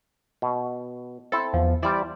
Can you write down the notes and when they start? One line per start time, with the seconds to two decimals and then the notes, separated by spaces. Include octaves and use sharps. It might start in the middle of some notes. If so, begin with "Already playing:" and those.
0.42 B2
1.32 C4 E4 A4
1.53 E2 F3
1.83 E3 G3 E4 C5 D5